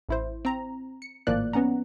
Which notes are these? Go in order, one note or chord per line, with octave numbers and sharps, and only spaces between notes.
A1 E4 C5
C4 A#5
C#7
G#1 A2 F3 A#3 D5 F#6
B3 C#4 F#5 A#5